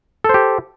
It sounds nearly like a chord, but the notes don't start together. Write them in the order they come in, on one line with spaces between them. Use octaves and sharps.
A4 C5 G4